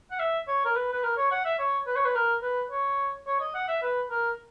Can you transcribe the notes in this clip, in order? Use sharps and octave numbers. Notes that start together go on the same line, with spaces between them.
F#5
E5
C#5
A#4
B4
B4
A#4
C#5
F#5
E5
C#5
B4
C#5
B4
A#4
B4
C#5
C#5
D#5
F#5
E5
B4
A#4